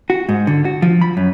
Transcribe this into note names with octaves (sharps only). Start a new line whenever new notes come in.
F#4
G#2
D3
F#4
F3
B5
F#2